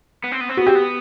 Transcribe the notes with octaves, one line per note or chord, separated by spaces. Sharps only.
B3
C4
B3
C4
B3 F#4
C4 G4
B3